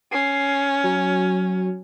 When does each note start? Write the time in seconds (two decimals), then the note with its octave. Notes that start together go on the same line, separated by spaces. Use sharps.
0.12 C#4 C7
0.84 F#3